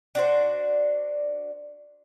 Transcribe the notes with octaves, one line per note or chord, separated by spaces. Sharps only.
D4 F#4 C5